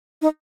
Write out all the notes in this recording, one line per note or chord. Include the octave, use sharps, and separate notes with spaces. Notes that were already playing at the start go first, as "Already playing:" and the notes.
D#4